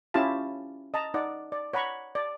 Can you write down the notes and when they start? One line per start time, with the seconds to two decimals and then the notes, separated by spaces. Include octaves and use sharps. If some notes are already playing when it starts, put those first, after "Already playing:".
0.14 C#4 E4 F4 G4 F5 A5
0.94 D#5 A5 A#5
1.14 D#4 D5 F#5
1.52 D5
1.73 C#5 F#5 A#5 B5 C#6
2.15 D5